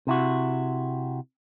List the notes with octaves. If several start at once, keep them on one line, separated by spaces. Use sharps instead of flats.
C3 E4 F#4